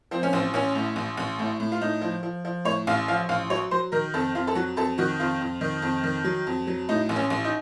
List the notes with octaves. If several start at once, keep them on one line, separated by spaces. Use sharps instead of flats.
F3 C4
C#4
A1 C4
A1 C#4
A2
A1
A1
A2
A2
F4
A2 D#4
F3
F3
F3
A2 C#5
A1 F5
F3 F5
A1 F5
F#3 C#5
F#3 C5
D#3 A#4
F2 A4
F2 F4
A4
F#3 F#4
F2 A4
D#3 F#4
F2 F4
F2
D#3
F2
D#3
F#3
F2
F#3
A2 D#4
A1
C#4
A1
D#4